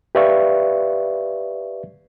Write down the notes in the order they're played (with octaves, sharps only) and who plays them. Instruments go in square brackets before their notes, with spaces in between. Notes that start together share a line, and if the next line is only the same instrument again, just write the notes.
[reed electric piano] G4 B4 D5 E5 F5 C#6